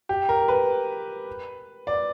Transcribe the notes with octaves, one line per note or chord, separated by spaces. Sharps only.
G4
A#4
B4
D5